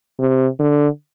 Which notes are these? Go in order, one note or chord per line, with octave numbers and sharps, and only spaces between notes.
C3
D3